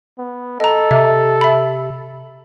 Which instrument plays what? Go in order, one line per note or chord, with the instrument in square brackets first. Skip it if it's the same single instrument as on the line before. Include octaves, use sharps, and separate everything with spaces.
[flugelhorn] B3
[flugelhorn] A4 [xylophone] D#5 A#5
[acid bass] C3 [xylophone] E5
[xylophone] E5 B5